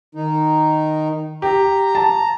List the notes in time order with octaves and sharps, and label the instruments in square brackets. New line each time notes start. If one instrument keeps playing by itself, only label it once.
[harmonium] D#3 D#4
[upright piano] G4 [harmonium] A#5
[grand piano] A5